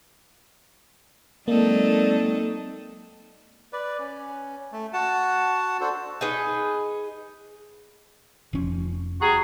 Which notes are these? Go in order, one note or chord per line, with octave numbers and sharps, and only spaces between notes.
F#3 G#3 A#3 C4 D#4 A4 D5
B4 D5
C#4
A3
F#4 F#5 A5
D4 F#4 A4 C5
D#4 G#4 B4
F1 F3 C#4
G3 F#4 G#4 A#5